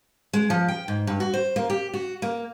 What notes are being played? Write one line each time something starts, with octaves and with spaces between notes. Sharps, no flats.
G#3
F3
G5
G#2
G2
F#4
C5
A#3
G4
F#4
A#3